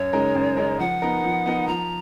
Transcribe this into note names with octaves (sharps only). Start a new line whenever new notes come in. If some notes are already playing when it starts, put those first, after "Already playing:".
Already playing: F#2 C#5
C#3 G#3 D#4 A#4
F#2
C#3 G#3 D#4 A#4
F3 F#5
B3 D#4 A#4
F3
B3 D#4 A#4
F3 A#5